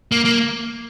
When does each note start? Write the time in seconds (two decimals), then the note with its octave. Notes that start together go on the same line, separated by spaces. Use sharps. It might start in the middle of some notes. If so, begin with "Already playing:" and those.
0.12 A#3
0.25 A#3